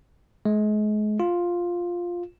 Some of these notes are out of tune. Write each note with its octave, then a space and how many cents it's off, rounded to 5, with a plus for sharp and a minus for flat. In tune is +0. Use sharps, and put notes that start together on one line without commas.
G#3 +35
F4 +5